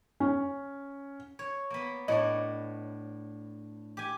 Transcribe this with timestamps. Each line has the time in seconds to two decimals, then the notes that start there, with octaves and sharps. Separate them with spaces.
0.20 C#4
1.39 C#5
1.70 A#3 B3
2.08 A2 D4 C#5 D#5
3.97 G4 G#5